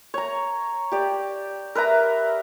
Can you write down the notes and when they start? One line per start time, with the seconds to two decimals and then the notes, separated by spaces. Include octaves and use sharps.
0.14 C#5 A#5
0.92 G4 D5
1.75 A#4 B4 E5 A#5